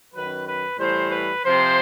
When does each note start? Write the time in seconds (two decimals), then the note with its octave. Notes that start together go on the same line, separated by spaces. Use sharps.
0.15 F#2 D#3 F#3 B4
0.46 B4
0.79 A2 E3 G3 C5
1.11 B4
1.44 C3 F3 C5